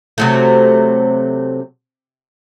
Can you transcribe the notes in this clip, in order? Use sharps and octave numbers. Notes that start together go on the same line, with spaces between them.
C3 F#3 A3